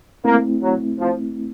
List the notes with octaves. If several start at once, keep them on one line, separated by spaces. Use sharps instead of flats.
A3 A#3 C4 E4
F#3
F3